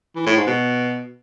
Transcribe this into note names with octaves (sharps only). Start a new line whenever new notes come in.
E3
A2
G#2
B2